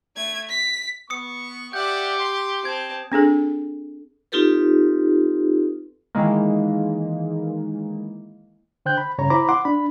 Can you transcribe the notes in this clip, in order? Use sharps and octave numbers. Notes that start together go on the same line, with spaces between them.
A3 G#6
B6
B3 C#6 D#6 C#7
G4 D5 E5 F#5 G6
C6
C4 A5 G#6
C4 D4 G#4 A4
C4 D#4 F4 G4 A4 B4
D#3 E3 G#3 A#3
D3 C5 G5 F#6 G6
B5
G2 C#3 C#5 A#5
E4 C5 A#5 B5 D6
F#5 C6 D6
D4 B5